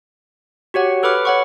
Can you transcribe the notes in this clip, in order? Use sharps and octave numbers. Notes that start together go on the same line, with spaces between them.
F#4 G4 C#5 F#5
A4 B4 B5 D6 F6
C#5 F#5 C#6